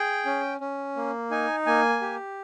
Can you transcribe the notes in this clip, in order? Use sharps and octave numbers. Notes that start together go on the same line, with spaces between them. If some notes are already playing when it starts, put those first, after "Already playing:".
Already playing: G#4 G5
C#4
C#4
A#3
D#4 G#5
A#3 G#5
G4